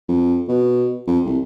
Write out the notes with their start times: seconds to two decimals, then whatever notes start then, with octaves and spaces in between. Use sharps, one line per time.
0.09 F2
0.48 B2
1.07 F2
1.26 C2